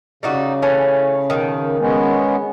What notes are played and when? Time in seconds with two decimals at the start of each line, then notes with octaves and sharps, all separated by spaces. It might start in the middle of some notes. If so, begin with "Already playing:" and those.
0.23 C#3 G3 D#4 F#4
0.62 E3 A3 C#4
1.30 B2 D#3
1.79 G#3 B3 C#4